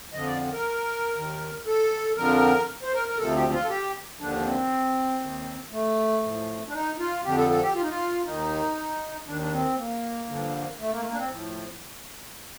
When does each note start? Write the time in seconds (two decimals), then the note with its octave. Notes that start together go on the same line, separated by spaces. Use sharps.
0.13 F2 D3 F3 D#5
0.26 D5
0.52 A#4
1.15 D#2 D#3
1.66 A4
2.17 F2 D3 F3 A#4
2.83 C5
2.93 A#4
3.08 A#4
3.18 D2 C3 F3 A4
3.36 G4
3.52 F4
3.64 A4
3.69 G4
4.20 D#2 D3 F3 D4
4.38 D4
4.45 C4
5.21 D#2 D#3
5.71 A3
6.23 A2 F3
6.68 D4
6.73 D#4
6.99 F4
7.24 F2 D3 F3 G4
7.37 A4
7.50 A4
7.62 G4
7.75 F4
7.82 D#4
7.89 F4
8.25 D#2 D#3 D#4
9.27 D#2 D#3 D4
9.41 D4
9.52 C4
9.78 A#3
10.29 G2 D3 F3
10.80 A3
10.92 A#3
11.00 A3
11.05 A#3
11.13 D4
11.18 C4
11.30 A2 F3